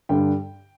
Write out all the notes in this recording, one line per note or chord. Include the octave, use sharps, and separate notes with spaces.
G2 D3 G3 D4 G5